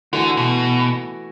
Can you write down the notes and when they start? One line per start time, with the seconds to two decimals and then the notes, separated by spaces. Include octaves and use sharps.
0.13 D3 E3 A3 F#4
0.37 B2